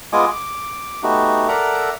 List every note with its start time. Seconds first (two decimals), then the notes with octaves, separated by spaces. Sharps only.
0.13 G#3 B3 F4 D#5 G#5 D6
0.29 D6
1.03 A3 B3 D#4 F#4 G4
1.48 A4 A#4 D5 E5 F#5 A#5